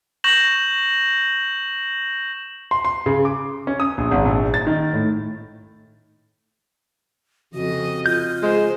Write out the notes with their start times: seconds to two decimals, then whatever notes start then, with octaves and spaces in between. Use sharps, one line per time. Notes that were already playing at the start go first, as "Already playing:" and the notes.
0.24 C#6 G6 A#6 E7 F#7
2.71 C6
2.85 C6
3.06 C#3
3.25 D6
3.67 C#4
3.80 D#6
3.98 A#1
4.11 G#1
4.25 A#1
4.54 A6
4.67 D#3
4.93 A2
7.54 F2 C#3 F#4 D#5
8.06 F4 G6
8.43 G#3 C5